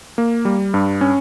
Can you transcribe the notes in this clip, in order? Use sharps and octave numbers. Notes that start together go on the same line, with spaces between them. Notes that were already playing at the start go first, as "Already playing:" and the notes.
A#3
G3
G2
C#4